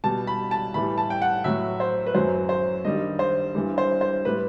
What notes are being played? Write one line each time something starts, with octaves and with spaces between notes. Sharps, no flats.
B2 G3 A5
B5
A5
A2 E3 G3 B5
A5
G5
F#5
A2 F#3 E5
C5
B4
F#2 F#3 C5
C5
G2 D#3 G3 D#5
C5
G2 E3 G3
C5
C5
A2 G3 B4